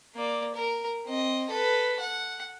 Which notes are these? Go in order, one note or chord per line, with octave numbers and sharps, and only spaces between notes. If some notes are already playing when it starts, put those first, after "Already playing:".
A#3 D5
A#4
C4 D#5
A4 B4
F#5